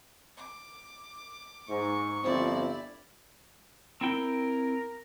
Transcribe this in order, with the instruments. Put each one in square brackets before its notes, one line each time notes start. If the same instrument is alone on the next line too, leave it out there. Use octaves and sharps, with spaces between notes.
[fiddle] D6
[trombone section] G#2 [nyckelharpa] C#6
[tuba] G1 [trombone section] F3 C4 [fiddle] E4 D5
[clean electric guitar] C4 E4 G5 [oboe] A#4